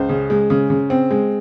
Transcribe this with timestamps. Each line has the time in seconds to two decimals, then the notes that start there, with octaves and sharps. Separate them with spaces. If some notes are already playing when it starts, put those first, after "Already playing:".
Already playing: C#2 C5
0.09 C#3
0.30 G#3
0.50 C#3
0.70 C#3
0.90 C4
1.11 G#3